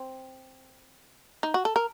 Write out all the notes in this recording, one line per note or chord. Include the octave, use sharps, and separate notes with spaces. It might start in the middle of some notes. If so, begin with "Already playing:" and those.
Already playing: C4
D#4
F#4
A4
A#4